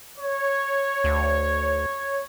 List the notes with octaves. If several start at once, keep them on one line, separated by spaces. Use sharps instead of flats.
C#5
D2